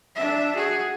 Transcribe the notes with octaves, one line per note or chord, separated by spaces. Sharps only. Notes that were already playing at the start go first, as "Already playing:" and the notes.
D4 E5
F#4 G#4